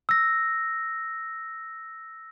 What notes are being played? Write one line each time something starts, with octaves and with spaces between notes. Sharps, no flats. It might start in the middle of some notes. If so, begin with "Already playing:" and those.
E6 A#6